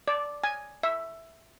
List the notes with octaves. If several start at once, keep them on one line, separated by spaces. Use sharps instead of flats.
D5
G#5
E5